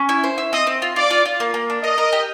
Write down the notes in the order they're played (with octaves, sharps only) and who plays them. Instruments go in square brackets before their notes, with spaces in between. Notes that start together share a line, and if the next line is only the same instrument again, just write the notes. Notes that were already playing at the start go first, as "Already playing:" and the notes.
Already playing: [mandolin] C#4
E4
C5
E4
[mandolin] C4 [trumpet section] D#5
[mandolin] C4
F4
[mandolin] F4 [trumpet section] D5
[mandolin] F4
F4
A#3
A#3
D4
[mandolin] A#4 [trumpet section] D#5
[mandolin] A#4
G4